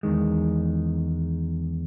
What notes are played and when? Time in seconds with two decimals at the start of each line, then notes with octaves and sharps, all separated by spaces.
0.03 E2 D#3 G#3